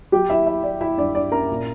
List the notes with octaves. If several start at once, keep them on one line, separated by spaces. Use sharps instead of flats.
F#3 G4 G5
E4 E5
E4 E5
E4 D5
E4 E5
G2 D5
G2 D5
C#4 A#4 A#5
A#2